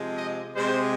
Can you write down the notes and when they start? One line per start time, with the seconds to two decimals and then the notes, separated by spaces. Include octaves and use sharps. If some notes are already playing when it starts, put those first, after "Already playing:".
Already playing: C3 F3 G#3
0.17 D#5
0.55 C3 G#3 C5